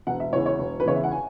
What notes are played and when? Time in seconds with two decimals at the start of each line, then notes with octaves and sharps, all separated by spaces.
0.07 E1 F#5
0.20 E5
0.33 E2 C#3 E3 C#5
0.46 C#5
0.59 E1
0.80 B4
0.86 E2 C#3 E3 C#5
0.95 E5
1.04 F#5
1.12 G#5